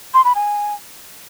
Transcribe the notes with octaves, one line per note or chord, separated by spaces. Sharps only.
C6
B5
G#5